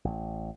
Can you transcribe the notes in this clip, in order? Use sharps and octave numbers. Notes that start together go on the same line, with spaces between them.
A1